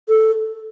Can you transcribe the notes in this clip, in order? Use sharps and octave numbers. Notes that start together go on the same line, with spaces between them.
A4